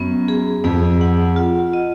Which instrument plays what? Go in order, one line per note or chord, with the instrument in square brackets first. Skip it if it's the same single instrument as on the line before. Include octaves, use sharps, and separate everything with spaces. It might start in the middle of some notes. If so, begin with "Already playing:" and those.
Already playing: [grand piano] F#2 [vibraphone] B3
[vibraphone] G#4
[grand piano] F2 [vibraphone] G#4
[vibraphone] F#5
F4
D#5